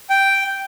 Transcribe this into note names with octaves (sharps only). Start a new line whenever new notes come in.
G5